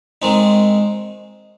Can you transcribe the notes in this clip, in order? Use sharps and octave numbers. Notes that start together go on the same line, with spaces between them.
D#3 G#3 C4 D#4